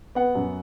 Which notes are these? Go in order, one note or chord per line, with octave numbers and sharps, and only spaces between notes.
B3 F#5
F#2